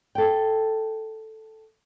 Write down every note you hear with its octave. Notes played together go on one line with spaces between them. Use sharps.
A4 G5